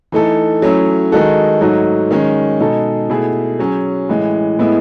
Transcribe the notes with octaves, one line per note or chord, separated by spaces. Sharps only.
E3 A3 D#4 A4
F#3 A3 C#4 E4
D#3 G#3 D#4 F#4 A4
G#2 F#3 A3 D#4 F#4
D#3 G#3 C#4
B2 G#3 D#4 A4
B2 A3 E4 G#4
F#3 C#4 G#4
A2 E3 G#3
A2 G#3 B3 E4